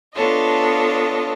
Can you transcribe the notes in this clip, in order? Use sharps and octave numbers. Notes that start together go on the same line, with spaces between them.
B3 D4 F4 A4 C#5 D#5